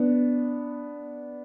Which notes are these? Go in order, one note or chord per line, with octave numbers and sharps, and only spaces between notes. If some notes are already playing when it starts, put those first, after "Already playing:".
Already playing: B3 D4